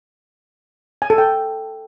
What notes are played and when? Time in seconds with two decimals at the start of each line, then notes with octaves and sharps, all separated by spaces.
1.02 G#5
1.10 A4
1.18 G5